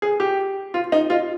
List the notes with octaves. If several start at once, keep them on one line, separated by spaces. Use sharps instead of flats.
G#4
G4
F4
D#4
F4